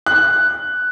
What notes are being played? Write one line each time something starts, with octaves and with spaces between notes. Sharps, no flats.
F#6